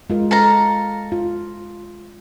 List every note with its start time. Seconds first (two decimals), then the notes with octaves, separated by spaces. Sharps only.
0.10 G#3 F4 A#4
0.31 A4 F5 A#5
1.12 F4